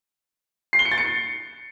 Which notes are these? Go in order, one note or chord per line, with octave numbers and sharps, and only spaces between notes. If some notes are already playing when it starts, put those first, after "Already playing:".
C7
G7
C#7
A6
C#7